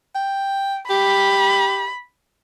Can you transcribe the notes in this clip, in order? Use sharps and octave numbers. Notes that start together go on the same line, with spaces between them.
G5
G4 B5